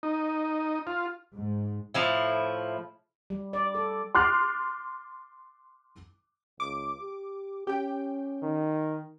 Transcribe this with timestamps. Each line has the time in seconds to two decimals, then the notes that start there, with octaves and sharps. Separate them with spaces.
0.03 D#4
0.87 F4
1.34 G#2
1.94 A2 F3 E4
3.30 G3
3.53 D5
3.75 A4
4.15 C6 D6 F6 F#6 A6 C7
6.60 C#2 D6
7.01 G4
7.67 C#4 G4 G5
8.43 D#3